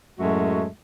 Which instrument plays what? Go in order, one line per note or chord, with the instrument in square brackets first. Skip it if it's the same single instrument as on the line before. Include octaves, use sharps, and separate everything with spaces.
[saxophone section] F#2 A2 G#3 A3 F#4 E5